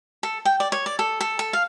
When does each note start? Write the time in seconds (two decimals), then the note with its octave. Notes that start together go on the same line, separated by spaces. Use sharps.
0.23 A4
0.45 G5
0.60 D5
0.72 C#5
0.86 D5
0.99 A4
1.21 A4
1.39 A4
1.53 F5